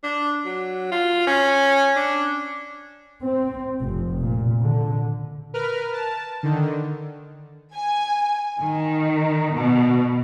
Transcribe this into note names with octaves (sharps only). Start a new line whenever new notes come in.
D4
F#3
F4
C#4
D4
C4
F1
A#2
D3
A#4 B4 F6
A5
D3 D#3
G#5
D#3
B2